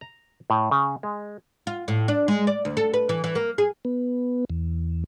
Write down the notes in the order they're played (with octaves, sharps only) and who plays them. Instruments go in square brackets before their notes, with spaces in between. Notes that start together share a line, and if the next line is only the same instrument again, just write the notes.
[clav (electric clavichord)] A#5
A2
C#3
G#3
[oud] F4
A2
D4
G#3
D5
D2
A4
B4
E3
E3
A#3
G#4
[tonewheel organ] B3
E2